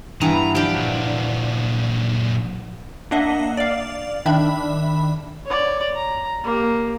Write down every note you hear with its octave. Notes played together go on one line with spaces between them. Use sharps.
G2 E3 B3 A#5
F3 D4 G4
A#2 F#3
A#3 D4 D#5 E5 F#5
D5 F5
D#3 D4 E5 B5
C#5 D5
A#5
A#3 G4